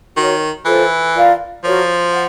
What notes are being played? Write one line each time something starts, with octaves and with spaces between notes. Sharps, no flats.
D#3 F#4 A#4 C#5
E3 F4 A4 C5
F4 A#4 D5 F5
F3 F#4 A#4 C#5
F#5